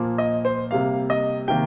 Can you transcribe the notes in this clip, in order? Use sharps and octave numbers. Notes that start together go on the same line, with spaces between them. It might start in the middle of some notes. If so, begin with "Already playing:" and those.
Already playing: A#2 F3 A#3
D#5
C5
C3 G3 A#3 F5
D#5
C3 D#3 A#3 G5